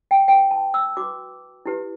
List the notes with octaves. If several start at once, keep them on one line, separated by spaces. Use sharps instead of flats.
G5
E4 B4 G5
A5
E6
F#4 B4 D6
E4 G4 B4